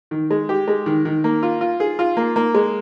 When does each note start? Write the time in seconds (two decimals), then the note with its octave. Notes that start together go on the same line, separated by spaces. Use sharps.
0.11 D#3
0.31 G#3
0.49 G4
0.68 G#3
0.86 D#3
1.05 D#3
1.24 A#3
1.43 F4
1.61 F4
1.80 G#4
1.99 F4
2.17 A#3
2.36 A#3
2.55 G#3